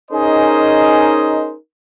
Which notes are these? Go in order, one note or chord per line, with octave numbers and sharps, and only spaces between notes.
C#4 D#4 G#4 A#4 C5 D#5